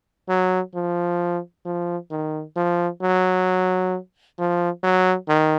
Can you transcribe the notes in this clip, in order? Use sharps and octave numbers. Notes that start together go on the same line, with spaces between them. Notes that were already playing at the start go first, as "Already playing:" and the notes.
F#3
F3
F3
D#3
F3
F#3
F3
F#3
D#3